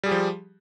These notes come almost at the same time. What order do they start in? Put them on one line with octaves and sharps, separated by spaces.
G3 G#4 G4 F3